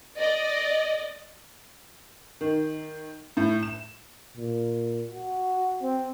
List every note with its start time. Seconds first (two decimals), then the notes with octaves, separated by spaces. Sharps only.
0.18 D5 D#5
2.41 D#3
3.37 A2
3.63 E7
4.37 A#2
5.11 F#4
5.82 C4